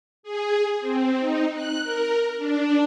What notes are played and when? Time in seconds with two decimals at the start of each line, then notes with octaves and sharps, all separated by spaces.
0.23 G#4
0.81 C4
1.20 D#4
1.54 F#6
1.83 A#4
2.38 D4